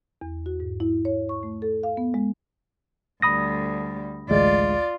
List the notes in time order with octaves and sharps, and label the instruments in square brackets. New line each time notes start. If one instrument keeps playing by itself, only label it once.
[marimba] E2
F#4
G#2
E4
C#5
C#6
A3
A4
F5
B3
G#3
[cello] D2 G3 [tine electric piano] B5 D#6 A#6
[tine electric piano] A1 D2 G#3 [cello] F4 D5